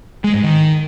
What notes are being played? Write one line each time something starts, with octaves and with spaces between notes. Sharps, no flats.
G#3
G#2
D#3